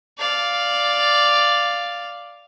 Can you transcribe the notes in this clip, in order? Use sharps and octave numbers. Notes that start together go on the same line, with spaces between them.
D5 F5